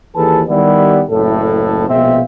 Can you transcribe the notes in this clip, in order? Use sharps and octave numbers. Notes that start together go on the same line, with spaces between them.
D#2 E3 G#4 A4 B4 A5
D#3 G3 B3 E4 G4 D5
F#1 A2 A4
A#1 B2 G#3 C4 E5 F5